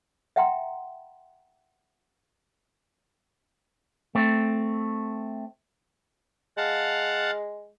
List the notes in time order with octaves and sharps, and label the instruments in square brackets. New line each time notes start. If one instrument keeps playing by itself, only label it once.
[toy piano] E5 F#5 G5 A#5 C6
[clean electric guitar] A3 C4
[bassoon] G#3 [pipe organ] F5 F#5 A5